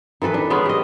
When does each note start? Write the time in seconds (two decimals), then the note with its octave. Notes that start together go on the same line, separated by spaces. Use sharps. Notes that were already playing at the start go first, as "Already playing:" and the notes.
0.22 D#3 E3 A4 B4
0.34 D4
0.50 G#3 B3 C#4
0.66 G4 D#5